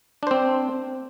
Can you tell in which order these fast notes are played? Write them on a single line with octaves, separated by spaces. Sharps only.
D4 C5 C4